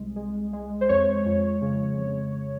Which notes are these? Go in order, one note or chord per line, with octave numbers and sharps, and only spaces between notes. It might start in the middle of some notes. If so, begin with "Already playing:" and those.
Already playing: C2 G#3
G#3
G#3
C5
F2 C#5
F2
C#3
F2